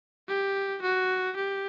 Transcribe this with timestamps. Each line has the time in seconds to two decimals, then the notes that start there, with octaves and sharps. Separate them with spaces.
0.28 G4
0.82 F#4
1.36 G4